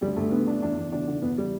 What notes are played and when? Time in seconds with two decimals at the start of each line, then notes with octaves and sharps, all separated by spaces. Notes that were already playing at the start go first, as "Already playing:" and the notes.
0.01 D2 G3
0.16 D2 A3
0.31 D3 B3
0.46 D3 D4
0.62 E2 D4
0.78 E2
0.92 D3 D4
1.08 D3
1.22 E2 B3
1.38 G3